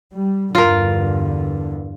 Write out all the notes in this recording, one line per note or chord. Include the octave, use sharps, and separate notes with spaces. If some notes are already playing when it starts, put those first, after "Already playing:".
G3
E2 G2 D3 F4 A#4